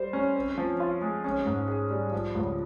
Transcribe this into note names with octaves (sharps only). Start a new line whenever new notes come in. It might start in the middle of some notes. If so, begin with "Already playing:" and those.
Already playing: G3 C5
C#4
C4
F3
F4
G#3
C#4
G#2
G#4
G3
F3
C#2